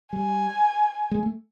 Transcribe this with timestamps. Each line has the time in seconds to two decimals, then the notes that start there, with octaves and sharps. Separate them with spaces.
0.13 G3 G#5
1.11 G#3
1.23 A3